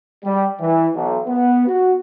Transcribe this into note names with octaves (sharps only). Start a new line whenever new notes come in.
G3
E3
B1
B3
F#4